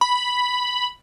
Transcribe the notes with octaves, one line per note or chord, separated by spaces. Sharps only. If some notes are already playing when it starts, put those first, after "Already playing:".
B5